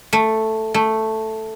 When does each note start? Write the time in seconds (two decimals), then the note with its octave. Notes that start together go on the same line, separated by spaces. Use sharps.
0.13 A3
0.74 A3